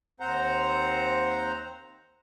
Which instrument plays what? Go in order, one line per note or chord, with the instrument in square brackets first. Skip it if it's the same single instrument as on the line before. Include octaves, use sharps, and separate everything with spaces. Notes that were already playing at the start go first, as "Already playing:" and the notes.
[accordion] D#2 C4 C5 F#5 A#5